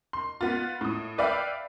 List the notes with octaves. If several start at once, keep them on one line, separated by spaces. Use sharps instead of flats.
C6
B3 F4
A2 D#6
B4 D5 E5 F5 G5